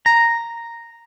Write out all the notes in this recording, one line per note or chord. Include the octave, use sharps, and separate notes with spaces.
A#5